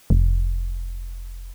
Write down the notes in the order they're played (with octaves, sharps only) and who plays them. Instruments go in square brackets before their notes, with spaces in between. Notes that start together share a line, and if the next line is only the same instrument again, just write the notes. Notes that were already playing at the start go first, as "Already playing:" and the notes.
[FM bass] F1